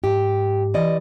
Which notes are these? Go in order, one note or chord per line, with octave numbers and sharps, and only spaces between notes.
G#2 G4
E3 D5 D#5